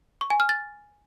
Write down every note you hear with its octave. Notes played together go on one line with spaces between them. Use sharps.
C#6
G#5
F6
A6